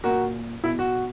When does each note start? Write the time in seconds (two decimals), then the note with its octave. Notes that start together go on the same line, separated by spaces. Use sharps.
0.04 A#2 F#4 A#4
0.64 B2 E4
0.79 F#4